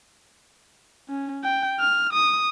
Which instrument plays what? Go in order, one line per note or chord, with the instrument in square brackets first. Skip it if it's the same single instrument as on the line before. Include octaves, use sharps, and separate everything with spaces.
[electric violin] C#4
G5
F6
D#6